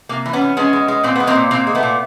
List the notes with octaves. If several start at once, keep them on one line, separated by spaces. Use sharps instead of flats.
C3 A#3
E3
B3 C#4
E3
G#3 B3 C#4
G#3
G#3
A#2 C4
G#3 B3
A#3 C4
A#2
A#2 A#3 C4
G#3
A3 B3
A#2